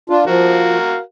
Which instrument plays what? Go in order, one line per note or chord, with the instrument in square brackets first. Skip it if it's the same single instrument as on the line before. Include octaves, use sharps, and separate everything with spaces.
[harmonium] D4 F4
[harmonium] F3 [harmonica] F#4 A#4 F5